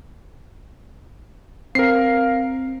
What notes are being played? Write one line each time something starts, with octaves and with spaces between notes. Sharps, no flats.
C4 A#4 F5 C7